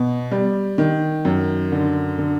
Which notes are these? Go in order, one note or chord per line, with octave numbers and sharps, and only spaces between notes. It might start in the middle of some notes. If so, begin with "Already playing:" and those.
Already playing: B2
G3
D#3
F#2
D3
D3